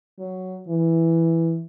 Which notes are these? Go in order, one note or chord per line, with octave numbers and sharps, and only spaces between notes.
F#3
E3